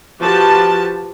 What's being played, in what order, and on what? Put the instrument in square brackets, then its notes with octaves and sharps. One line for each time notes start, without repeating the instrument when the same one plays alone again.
[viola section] F3 F#4 G4 B4 A5